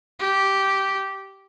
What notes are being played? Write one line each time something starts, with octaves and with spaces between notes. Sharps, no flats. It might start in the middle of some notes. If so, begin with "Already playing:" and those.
G4